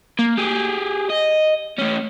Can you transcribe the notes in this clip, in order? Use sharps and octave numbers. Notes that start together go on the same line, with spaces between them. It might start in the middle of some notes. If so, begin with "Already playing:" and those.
A#3
G4 G#4
D#5
A3 C#4